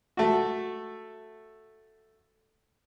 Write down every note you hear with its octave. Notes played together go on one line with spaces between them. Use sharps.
A3 F#4